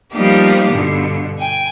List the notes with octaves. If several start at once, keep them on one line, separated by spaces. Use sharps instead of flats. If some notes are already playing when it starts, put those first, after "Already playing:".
F3 G3 A#3 B3 D#4 G4
G2 B2 D3
G5 G#5